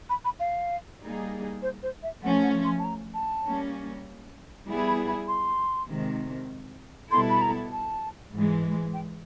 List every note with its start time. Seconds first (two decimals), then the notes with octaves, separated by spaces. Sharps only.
0.10 B5
0.25 B5
0.40 F5
1.01 G3 A#3 D#4 G#4
1.62 C5
1.83 C5
2.03 E5
2.23 F3 A3 C#4 F#5
2.43 F#5
2.64 C6
2.79 A5
2.84 A#5
3.14 A5
3.45 G3 A#3 C#4
4.67 G3 B3 E4 G#4
4.88 B5
5.07 B5
5.28 C6
5.88 C3 D#3 G#3
7.10 B2 G3 B3 E4 A4 C6
7.30 B5
7.42 A#5
7.72 A5
8.32 G#2 E3 G#3
8.94 G5